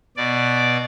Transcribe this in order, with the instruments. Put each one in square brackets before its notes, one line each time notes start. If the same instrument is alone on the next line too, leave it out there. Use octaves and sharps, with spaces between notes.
[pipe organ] B2 D5